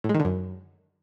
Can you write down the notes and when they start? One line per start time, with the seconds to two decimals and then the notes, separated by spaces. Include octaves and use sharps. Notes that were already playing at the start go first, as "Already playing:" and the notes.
0.04 A2
0.09 G#3
0.15 D#3
0.20 D3
0.25 F#2